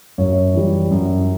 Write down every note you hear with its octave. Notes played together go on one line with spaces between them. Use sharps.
F#2 C#5
E3 G3
F#2